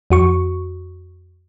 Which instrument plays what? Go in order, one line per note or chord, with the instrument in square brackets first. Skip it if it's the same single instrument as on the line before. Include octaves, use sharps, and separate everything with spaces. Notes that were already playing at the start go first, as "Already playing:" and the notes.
[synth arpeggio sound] F2 F#4 C#6